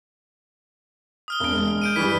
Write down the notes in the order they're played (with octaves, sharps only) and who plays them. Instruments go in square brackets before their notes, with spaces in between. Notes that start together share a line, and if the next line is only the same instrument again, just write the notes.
[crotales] D#6 F6 G7
[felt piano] E1 D7
G#3
[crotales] G6 D7 D#7
[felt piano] G2 E3 G3 [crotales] B6